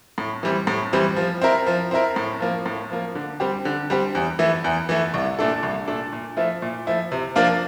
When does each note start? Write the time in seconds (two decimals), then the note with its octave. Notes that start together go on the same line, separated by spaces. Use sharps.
0.18 A2
0.43 E3 G3 C4
0.67 A2
0.93 E3 G3 C4
1.16 F3
1.42 C4 E4 A#4
1.66 F3
1.91 C4 E4 A#4
2.16 A2
2.40 F3 A#3
2.66 A2
2.90 F3 A#3
3.15 D3
3.40 G3 C4 G4
3.65 D3
3.90 G3 C4 G4
4.15 E2
4.39 E3 A3
4.64 E2
4.89 E3 A3
5.14 C2
5.39 A#2 A3 D4 A4
5.63 C2
5.87 A#2 A3 D4 A4
6.13 A#2
6.37 F3 A3 E4
6.62 A#2
6.87 F3 A3 E4
7.12 C3
7.35 F3 A#3 D4 F4